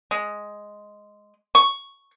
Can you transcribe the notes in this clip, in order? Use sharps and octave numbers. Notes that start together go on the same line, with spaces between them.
G#3
C#6